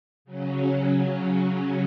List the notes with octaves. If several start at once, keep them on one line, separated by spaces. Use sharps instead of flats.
C#3 F#3 C#4